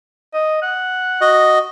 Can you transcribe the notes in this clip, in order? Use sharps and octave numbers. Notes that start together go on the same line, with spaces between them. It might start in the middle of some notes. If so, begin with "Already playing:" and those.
D#5
F#5
F#4 D#5